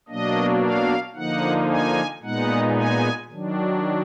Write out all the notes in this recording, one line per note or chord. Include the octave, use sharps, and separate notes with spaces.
B2 F#3 A#3 D4 D#5
F5
D3 F3 A#3 D#4 F#5
G#5
A#2 G#3 B3 D#4 F#5
G#5
D#3 F#3 D4